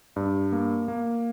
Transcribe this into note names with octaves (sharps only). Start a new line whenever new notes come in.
G2
A#3
A#3